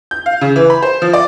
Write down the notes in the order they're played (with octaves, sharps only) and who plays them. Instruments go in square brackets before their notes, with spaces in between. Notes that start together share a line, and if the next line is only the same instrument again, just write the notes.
[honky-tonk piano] G6
F5
C#3
E3
B5
C5
F3
D5